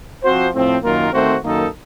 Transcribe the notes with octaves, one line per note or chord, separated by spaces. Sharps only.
F3 C4 F#4 C5
A2 F3 C4
F#2 D#3 A#3 F4 A#4
D#3 A3 C4 F#4 C5
F#2 D#3 A#3 D#4 A4